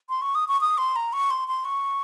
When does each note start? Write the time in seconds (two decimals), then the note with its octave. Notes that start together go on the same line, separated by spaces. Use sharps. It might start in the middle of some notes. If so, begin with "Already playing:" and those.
0.09 C6
0.22 C#6
0.35 D#6
0.48 C#6
0.61 D#6
0.78 C6
0.96 A#5
1.13 C#6
1.30 C6
1.48 C6
1.65 C#6